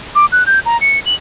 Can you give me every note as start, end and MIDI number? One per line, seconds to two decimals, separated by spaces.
0.15 0.26 86
0.32 0.43 90
0.46 0.59 91
0.66 0.79 82
0.81 0.99 97
1.06 1.14 102